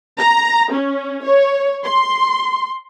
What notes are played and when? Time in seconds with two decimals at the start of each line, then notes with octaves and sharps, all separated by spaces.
0.18 A#5
0.73 C#4
1.25 C#5
1.84 C6